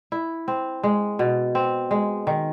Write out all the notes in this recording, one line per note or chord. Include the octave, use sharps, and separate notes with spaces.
E4
C4
G#3
B2
C4
G#3
D#3